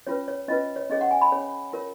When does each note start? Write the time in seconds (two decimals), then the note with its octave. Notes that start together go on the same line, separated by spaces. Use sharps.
0.07 C#4 F4 B4 C#5
0.28 C#5
0.48 C#4 F4 B4 D#5
0.76 C#5
0.90 C#4 G#4 C#5 D#5
1.01 F#5
1.11 G#5
1.21 B5
1.32 C#4 G#4 C#5
1.73 F4 A#4 C#5